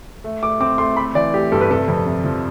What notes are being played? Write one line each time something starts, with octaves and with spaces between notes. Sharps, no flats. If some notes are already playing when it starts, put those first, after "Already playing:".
A3
A3 D6
C4 D6
A3 C6
A3 B5
E3 D5
A3 G4
G2 A4
B4
C3 A4
F2
C3
F3